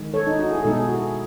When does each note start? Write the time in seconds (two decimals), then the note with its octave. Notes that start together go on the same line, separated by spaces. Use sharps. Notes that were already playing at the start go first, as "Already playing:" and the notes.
Already playing: D#3 G#3
0.14 A4 C#5
0.27 D#4
0.39 D#4 F#4
0.51 E4 G#4
0.64 B2 G#3 D#4 A4
0.74 G#4
0.84 F#4
0.94 E4 G#4